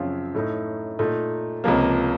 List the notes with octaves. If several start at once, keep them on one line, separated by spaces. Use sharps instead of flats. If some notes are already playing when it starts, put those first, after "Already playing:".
Already playing: F#2 C#3 F3 C4 F4
A2 A3 D#4
A#2 A3 D#4
C#2 C3 F3 A#3